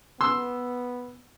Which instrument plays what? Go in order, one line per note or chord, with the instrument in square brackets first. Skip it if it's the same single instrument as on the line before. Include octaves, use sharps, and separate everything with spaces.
[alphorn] B3 [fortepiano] C6 E6